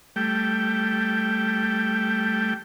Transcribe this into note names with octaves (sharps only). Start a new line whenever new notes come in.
G3 A3 G5